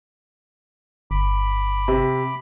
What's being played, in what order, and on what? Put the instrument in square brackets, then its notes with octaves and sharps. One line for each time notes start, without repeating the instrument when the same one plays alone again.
[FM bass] G1 [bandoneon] B5 D6
[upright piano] C3